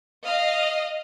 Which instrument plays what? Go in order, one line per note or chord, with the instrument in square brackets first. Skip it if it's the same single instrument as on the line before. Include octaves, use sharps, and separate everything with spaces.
[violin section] D#5 F5